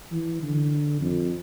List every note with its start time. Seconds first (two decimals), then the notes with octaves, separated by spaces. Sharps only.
0.12 E3
0.43 D3
1.00 F2